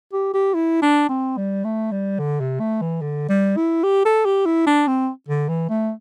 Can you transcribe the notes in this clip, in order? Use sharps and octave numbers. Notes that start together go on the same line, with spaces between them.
G4
G4
E4
D4
C4
G3
A3
G3
D3
C3
A3
E3
D3
G3
E4
G4
A4
G4
E4
D4
C4
D3
E3
A3